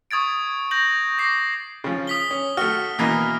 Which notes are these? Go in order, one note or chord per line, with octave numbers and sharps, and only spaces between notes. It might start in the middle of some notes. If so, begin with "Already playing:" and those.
C#6 D#6 G#6 A6 D7
G6 A#6 F#7
D6 A#6 C7
C#3 F3
D#6 B6 G7
C#4
A3 F#4 F6
B2 E3 A#3 D#6